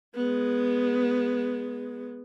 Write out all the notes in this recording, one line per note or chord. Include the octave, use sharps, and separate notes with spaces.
G#3 B3